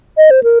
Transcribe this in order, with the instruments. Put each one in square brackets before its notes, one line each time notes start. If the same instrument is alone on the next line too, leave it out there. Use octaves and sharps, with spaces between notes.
[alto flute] D#5
C5
A#4